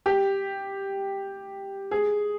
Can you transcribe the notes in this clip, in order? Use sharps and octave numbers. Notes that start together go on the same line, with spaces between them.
G4
G#4